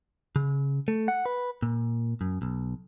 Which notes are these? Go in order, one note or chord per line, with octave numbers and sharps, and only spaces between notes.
C#3
A3
F#5
B4
A#2
F#2
B1